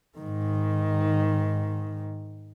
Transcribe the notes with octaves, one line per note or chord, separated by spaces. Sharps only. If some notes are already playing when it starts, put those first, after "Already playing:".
G#2 D#3